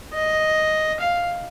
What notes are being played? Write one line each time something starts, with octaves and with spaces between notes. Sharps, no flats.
D#5
F5